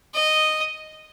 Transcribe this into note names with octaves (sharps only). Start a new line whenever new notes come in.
D#5